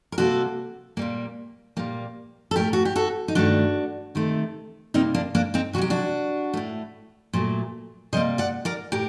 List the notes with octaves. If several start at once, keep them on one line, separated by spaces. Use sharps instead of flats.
A#4
C3 G3 A#3 F#4 A4
A#2 G3 A#3
A#2 G3 A#3
A4
A2 A3 G4 A#4
F#4
G4
F#4 A4
D#4
G2 D#3 A3 D4 F#4
C3 D#3 A3
C3 G3 A#3 C4 D#4
A#3 D4
A#3 D4
C4 D#4
C3 D#3 F#3 F#4 G4
D4 F#4
A2 A3
A#2 F#3 A3
C3 G3 A#3 C5 D#5
D5 F#5
A#4 D5
A2 G4 A#4